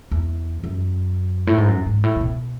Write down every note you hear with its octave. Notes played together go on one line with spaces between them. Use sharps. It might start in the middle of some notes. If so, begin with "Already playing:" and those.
E2
F#2
A2
G#2
F#2
G#2
A2
C#3
B2